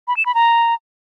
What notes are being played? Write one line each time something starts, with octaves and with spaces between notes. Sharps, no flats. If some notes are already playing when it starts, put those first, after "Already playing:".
B5
E7
B5
A#5